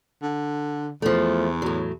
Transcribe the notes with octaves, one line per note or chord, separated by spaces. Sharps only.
D3
E2 F3 A3
A2 F#3